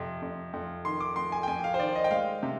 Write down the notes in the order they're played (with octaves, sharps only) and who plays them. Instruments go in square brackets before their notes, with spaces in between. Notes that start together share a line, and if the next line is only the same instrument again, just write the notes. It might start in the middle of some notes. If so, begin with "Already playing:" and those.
Already playing: [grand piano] F2 C3
F2
F2
D#3 C6
D6
F2 C6
G#5
G5
F2 G#5
F5
C5
D#3 D5
D#5
G5
G#3 F5
C3